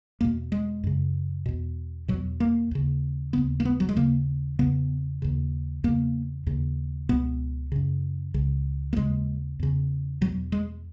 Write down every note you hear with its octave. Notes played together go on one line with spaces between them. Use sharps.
E2 B2 A#3
G#3
F#2 C#3
E2 B2
E2 B2 F#3
A#3
D#2 C#3
D#2 C#3 B3
A#3
B3
F#3
G#3
D#2 C#3 A#3
E2 C#3 B3
D#2 C#3
E2 C#3 A#3
D#2 C#3
C#2 B2 B3
F#2 C#3
C#2 C#3
A#3
D#2 C#3 G#3
E2 C#3
E2 B2 F#3
G#3